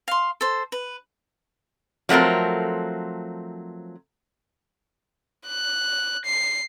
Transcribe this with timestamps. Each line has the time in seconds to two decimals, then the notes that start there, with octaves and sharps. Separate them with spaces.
0.08 F5 C6
0.41 A4 C5
0.72 B4
2.09 F3 F#3 A3 C4 A#4
5.48 F#6
6.25 C7